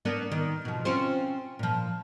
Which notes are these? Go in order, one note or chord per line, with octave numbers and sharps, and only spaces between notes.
A#3 B3 D4
D#3
B2 F3
C4 C#4 F4
A#2 F3